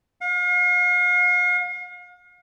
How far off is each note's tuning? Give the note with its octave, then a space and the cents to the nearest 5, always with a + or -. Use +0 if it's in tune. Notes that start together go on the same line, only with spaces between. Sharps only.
F5 +45